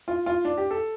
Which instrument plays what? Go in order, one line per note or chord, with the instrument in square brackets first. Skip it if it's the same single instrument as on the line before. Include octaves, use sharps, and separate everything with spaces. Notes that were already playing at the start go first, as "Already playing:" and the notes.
[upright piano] F4
F4
D4
G4
A4